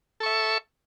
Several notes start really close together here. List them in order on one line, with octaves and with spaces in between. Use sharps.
A4 C#6 E5